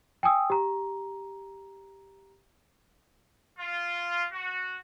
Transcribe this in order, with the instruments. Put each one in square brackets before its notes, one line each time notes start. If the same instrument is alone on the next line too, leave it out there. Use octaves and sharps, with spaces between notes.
[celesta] G5 G#5 D#6 E6
G4 A#5
[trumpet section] F4
F#4